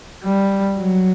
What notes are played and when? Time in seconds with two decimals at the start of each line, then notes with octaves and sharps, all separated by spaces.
0.24 G3
0.78 F#3